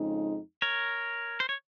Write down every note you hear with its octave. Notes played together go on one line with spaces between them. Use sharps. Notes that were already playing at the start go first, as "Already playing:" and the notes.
Already playing: F2 C#3 G#3 D#4
A#4 C#5
C5
C#5